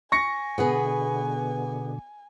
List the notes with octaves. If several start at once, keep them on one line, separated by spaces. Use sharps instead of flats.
G#5 C#6 A#6 C#7
B2 D3 B3 G#4 B4